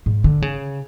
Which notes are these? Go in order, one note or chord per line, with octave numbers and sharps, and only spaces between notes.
G#2
D3
C#3